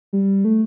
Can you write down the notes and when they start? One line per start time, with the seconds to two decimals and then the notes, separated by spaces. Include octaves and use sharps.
0.13 G3
0.45 A3